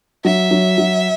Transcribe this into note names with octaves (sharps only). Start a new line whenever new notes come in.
F#3 E5
F#3
F#3